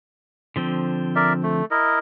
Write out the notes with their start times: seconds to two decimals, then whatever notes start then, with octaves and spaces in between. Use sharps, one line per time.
0.56 D3 F3 C4
1.16 A#4 D5 E5
1.43 A3
1.71 E4 A#4 D#5